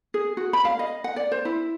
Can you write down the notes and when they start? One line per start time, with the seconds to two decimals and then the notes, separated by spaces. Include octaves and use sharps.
0.14 G#4
0.37 F#4
0.53 B5
0.65 F5
0.79 D#5
1.04 F#5
1.16 D5
1.32 C5
1.45 E4